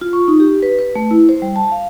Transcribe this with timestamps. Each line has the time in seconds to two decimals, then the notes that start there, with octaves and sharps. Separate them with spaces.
0.01 F4
0.13 C#6
0.28 D#4
0.40 G4
0.63 B4
0.79 B4
0.95 A3
1.11 E4
1.29 C5
1.42 G3
1.56 A5
1.72 F5